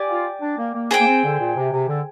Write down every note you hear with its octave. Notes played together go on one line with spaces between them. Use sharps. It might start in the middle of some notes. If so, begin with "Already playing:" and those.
Already playing: G4 D5 G#5
F4
D4
A#3
A#3
G#4 C5 G5
A#3
C4
D3
A#2
C3
C3
D3